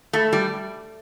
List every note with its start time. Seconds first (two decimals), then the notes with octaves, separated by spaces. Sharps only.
0.13 A3
0.33 G3